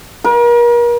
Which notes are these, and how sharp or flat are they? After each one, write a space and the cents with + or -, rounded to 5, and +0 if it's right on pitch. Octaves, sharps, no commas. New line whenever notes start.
A#4 +40